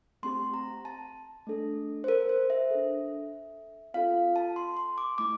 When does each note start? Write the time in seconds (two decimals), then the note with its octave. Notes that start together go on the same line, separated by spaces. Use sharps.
0.23 A3 C4 G4 C6
0.54 A#5
0.85 A5
1.47 A3 D4 A4
2.04 C5
2.08 A#4
2.29 C5
2.50 E5
2.71 D4 A4
3.94 C4 F4 A4 F5
4.36 A5
4.56 C6
4.77 C6
4.98 D6
5.18 A3 E4 D6